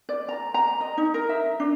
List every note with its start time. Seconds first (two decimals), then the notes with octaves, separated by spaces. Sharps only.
0.09 D5
0.29 A#5
0.54 A#5
0.81 D#5
0.98 D#4
1.14 A#4
1.29 E5
1.60 D4